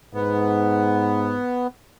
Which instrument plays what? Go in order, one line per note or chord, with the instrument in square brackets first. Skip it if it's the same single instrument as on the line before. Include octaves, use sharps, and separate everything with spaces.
[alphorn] G#2 [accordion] B3